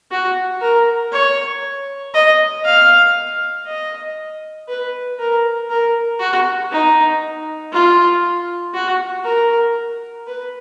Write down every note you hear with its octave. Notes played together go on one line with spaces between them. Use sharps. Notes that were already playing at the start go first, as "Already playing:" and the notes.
F#4
A#4
C#5
D#5
F5
D#5
B4
A#4
A#4
F#4
D#4
F4
F#4
A#4
B4